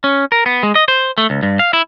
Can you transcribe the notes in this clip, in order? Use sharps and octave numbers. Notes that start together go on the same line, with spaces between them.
C#4
A#4
B3
G#3
D#5
C5
A3
C#2
G2
F5
E4